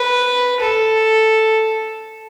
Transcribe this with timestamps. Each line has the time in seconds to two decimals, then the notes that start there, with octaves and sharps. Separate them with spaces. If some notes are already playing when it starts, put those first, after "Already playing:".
Already playing: B4
0.60 A4